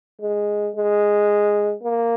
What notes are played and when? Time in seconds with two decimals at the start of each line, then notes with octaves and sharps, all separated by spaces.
0.22 G#3
0.76 G#3
1.83 A#3